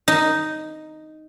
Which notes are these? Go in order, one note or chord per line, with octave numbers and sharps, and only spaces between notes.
D#4